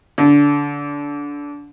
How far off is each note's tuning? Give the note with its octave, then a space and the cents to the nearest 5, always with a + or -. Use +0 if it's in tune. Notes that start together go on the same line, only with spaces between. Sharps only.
D3 -20